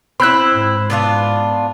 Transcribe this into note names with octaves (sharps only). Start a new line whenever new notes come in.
C4 E4 B5 E6 F#6
G#2
B3 D4 F4